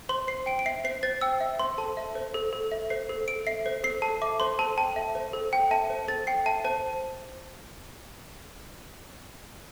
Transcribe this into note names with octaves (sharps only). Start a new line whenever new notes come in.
C5 C6
C5 C7
G5 D7
D7
E5 C7
C5 C7
C5 A6
G5 E6
E5
C5 C6
A4 A5
E5
C5
A4
A4
E5
C5 C7
A4
A4 D7
E5 C7
C5
A4 C7
A4 A5
E5 D6
C5 C6
A4 A5
G5 A5
E5
C5
A4
G5
E5 A5
C5
A4 A6
G5 C7
E5 A5
C5 A5